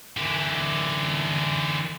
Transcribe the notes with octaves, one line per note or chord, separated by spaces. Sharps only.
D3 E3